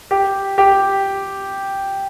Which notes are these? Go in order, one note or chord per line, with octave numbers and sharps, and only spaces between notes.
G4
G4